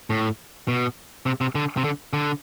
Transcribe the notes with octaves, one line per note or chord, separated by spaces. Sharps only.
A2
B2
C3
C3
D3
C3
D3
D3